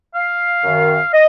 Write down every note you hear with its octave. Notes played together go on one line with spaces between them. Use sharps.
F5
F#2 D#3
D#5